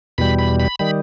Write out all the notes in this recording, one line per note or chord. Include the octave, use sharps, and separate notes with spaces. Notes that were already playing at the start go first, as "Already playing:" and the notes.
E2 B2 G3 B5
B5
B5
D#3 G3 B5